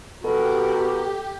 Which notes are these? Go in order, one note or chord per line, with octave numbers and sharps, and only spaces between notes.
B2 F#4 G4 A4 A#4